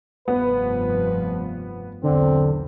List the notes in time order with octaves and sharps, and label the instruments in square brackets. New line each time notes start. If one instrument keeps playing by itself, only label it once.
[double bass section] F1 G2 F3 [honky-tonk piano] B3 [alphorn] B4
[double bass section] B1 E2 [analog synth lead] D3 [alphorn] C4